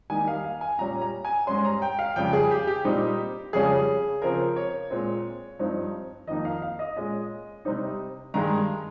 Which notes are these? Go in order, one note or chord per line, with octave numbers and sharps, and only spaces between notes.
D#3 G3 A#3 D#4 G#5
F5
F5
G#5
A#2 G3 C#4 A#5
A#5
G#5
G#2 G3 C#4 C6
A#5
G5
F5
F2 C#3 G3 G5
G#4
G4
G4
A#2 G3 C4 D#4
F2 C#3 G3 C#4 G#4
C#3 F3 C4 A#4
C#5
A#2 G#3 C4
G2 F3 C4 D#4
F2 D#3 A#3 D#4 D#5
F5
F5
D#5
A#2 G#3 C#4 D#5
C3 G3 C4 D#4
G2 D#3 G#3 A#5